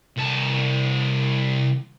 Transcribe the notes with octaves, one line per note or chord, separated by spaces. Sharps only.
C2 A5